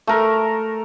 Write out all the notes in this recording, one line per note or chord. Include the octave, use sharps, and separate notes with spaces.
A3 A#4